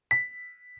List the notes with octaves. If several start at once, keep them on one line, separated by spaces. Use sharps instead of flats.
B6